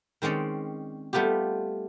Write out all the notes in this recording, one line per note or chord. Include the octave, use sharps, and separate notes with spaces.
D#3 G#3 C4 C#4 D5
G3 A3 B3 F4 G4